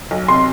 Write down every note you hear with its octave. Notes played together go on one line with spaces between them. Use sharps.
B1
C3 C6